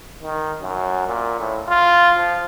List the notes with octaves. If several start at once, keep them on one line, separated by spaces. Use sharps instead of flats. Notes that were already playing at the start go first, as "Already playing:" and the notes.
D#3
F#2
A#2
A2
F4
F3